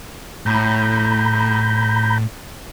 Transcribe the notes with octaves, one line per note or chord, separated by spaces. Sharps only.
A2 A#5 B5 G6